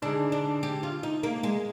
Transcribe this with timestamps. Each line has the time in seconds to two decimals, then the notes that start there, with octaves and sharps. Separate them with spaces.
0.02 D3 G#3 D4 D#4
0.32 D4
0.63 G4
0.83 F4
1.03 D#4
1.23 A#3
1.43 G#3